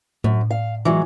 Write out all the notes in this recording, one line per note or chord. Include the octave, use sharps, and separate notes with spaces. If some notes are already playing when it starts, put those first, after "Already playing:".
F#2 A2
F5
E3 F#3 G#3